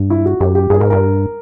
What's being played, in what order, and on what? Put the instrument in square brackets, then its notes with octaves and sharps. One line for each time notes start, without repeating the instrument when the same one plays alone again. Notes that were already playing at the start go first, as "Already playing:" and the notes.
Already playing: [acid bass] G2
[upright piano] E4
F#4
[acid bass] F#2 [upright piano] G4
[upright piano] G4
[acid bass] G2 [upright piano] G#4
[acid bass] G#2 [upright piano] A#4
[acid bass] G2 [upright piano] A#4